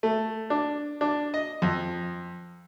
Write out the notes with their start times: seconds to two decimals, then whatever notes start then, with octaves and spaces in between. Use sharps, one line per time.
0.03 A3
0.50 D4
1.01 D4
1.34 D#5
1.62 F2